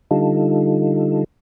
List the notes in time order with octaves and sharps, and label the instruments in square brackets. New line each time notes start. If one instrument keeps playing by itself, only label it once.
[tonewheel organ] D3 G3 D#4 F4 A4